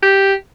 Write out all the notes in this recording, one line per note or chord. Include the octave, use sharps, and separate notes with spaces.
G4